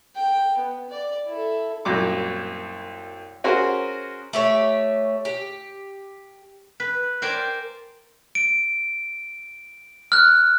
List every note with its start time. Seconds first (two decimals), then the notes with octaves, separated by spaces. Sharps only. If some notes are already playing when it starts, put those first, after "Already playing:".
0.16 G5
0.58 B3
0.90 D5
1.27 E4 A4
1.85 C2 F#2 A#2 D6
3.44 C#4 F#4 G#4 A#4 C5
4.33 A3 G4 C#5
5.25 G4
6.80 B4
7.22 A#4 C5 D5 G5 G#5
8.35 D7
10.12 F6 F#6